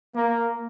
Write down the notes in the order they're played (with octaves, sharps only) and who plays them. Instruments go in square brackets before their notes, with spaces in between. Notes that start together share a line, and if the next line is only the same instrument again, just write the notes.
[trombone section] A#3